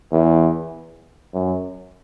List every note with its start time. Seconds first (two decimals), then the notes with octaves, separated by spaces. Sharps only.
0.12 E2
1.33 F#2